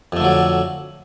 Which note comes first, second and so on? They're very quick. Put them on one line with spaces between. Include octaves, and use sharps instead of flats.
F2 A3 D3 F#3